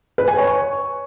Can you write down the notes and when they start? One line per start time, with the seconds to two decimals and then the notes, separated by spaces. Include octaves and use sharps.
0.18 B4
0.28 G#5
0.37 C#5
0.47 C#6